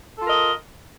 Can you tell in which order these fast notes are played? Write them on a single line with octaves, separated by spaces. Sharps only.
A4 F4 A#4 D#5